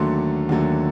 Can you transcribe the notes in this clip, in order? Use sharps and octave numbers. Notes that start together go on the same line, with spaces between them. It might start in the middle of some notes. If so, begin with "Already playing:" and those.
Already playing: D#2 D3 F#3 A3 C6
D#2 D3 F#3 A3